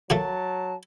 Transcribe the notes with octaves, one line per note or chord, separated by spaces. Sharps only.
F#3 A3 A#3 F#4 A5